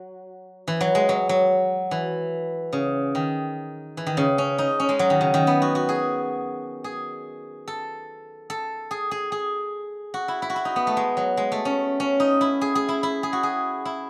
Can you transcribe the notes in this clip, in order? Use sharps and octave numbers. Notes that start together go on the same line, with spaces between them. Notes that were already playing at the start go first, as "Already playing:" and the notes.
Already playing: F#3
E3
F#3
G#3
F#3
F#3
E3
C#3
D#3
E3
D#3
C#3
C#4
D#4
C#4
G#3
F#3
D#3
C#3
D#3
B3
F#4
F#4
G#4
G#4
A4
A4
G#4
G#4
G#4
F#4
E4
E4
F#4
E4
D#4
B3
A3
G#3
F#3
G#3
A3
C#4
C#4
D#4
E4
G#4
G#4
E4
E4
G#4
F#4
G#4
E4